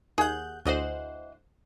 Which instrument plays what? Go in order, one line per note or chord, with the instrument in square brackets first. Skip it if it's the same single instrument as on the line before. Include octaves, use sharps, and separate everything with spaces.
[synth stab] D#2 G6 [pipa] G#4 F#5
[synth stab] D2 C5 [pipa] E3 D#5 F#5